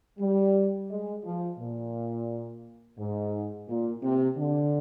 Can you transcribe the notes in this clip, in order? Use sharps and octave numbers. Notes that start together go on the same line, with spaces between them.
G3
G#3
F3
A#2
G#2
A#2
C3
D3